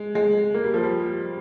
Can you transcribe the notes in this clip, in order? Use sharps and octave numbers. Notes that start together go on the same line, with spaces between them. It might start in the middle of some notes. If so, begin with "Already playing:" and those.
Already playing: G#3
G#3
A#3
G3
F3
G3